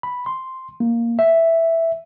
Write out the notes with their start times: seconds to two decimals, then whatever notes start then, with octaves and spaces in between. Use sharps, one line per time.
0.03 B5
0.26 C6
0.80 A#3
1.19 E5